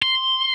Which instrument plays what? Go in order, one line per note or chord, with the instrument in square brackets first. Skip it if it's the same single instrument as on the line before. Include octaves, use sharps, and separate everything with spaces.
[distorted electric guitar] C6